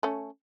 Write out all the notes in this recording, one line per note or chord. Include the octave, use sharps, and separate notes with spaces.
A3 C#4